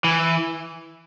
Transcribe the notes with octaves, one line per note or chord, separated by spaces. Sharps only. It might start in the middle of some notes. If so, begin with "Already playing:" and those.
E3